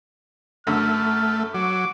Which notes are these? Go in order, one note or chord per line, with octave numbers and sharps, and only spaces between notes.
F#2 D3 A3 F6
F#3 D6